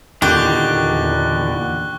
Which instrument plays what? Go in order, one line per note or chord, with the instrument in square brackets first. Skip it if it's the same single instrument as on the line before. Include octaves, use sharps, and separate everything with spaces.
[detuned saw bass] E2 [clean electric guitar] A#2 D3 D#3 [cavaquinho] G4 [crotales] C#6 F#6 G7